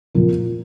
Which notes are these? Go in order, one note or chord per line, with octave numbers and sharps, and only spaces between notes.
A#2 F3 A#3